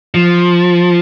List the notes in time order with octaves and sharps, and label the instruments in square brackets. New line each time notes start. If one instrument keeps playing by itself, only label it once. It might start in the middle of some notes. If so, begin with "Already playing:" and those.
[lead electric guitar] F3